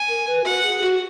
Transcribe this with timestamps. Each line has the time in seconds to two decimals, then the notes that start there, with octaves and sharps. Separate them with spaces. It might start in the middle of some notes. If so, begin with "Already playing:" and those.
Already playing: G#5
0.08 A#4
0.26 B4
0.44 F#4 F#5
0.63 G#4
0.81 F#4